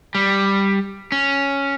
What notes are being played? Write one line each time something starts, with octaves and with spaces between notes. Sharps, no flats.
G3
C#4